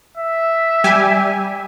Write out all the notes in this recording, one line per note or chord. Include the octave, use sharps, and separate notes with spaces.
E5
G3 G4 G#5